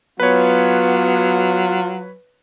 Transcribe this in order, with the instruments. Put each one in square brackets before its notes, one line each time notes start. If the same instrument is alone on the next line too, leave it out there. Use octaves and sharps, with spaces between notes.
[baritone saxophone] F#3 [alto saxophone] B3 [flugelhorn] F4 [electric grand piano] B4 C#5